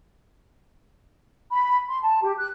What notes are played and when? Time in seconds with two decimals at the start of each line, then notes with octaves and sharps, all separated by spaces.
1.53 B5
1.88 C6
2.02 A5
2.23 G4
2.38 F#6